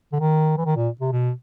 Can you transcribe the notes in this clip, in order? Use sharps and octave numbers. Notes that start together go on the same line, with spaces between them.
D3
D#3
E3
D#3
A#2
C3
B2